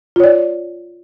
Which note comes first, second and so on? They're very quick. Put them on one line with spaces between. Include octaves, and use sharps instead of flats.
F4 C#5 D5